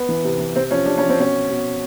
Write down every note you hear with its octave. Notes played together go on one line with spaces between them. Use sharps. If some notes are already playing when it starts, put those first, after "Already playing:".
Already playing: B3
E3
C3
E3
C3 C4
F3 C#4
C3 D4
F3 C#4
C4
B2 C#4
B2